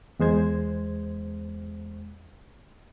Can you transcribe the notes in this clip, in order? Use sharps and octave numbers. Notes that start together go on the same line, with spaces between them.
E2 G#3 C5 G#6